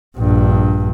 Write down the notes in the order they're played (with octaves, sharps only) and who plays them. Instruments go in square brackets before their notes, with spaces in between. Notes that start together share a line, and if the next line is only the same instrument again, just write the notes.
[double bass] A#1 G2